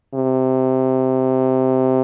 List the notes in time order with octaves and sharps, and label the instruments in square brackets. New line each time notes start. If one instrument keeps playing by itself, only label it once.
[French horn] C3